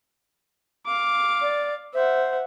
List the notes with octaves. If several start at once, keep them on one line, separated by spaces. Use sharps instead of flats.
F5 D6
D5
C5 E5 F#5